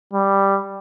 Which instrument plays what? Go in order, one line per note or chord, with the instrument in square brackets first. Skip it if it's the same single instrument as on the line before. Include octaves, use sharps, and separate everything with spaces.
[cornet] G3